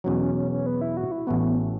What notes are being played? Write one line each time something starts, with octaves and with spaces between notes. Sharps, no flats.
E2 B2 F#3 C#4
C#4
C#4
C#4
B3
E4
F#4
E4
A1 A2 A3 B3 F#4 B4
B3